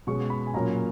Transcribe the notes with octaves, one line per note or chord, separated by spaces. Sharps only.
B2 G#3 C#4 C#6
B5
G#5
A#2 F#3 A#3 C#4 A#5